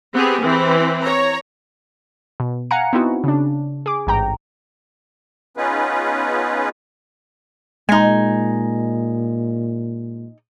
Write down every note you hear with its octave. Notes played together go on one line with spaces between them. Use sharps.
B3 C4 G4 G#4
E3 C4
C#5 A#5
B2
F5 F#5 G#5 A#5 C#7
B3 C4 D#4 E4 F#4
C#3 D4
G#4 D6
A1 G#2 G5 A#5
B3 C#4 D#4 F4 G#4 B4
A#2 G#3 D#4 G#5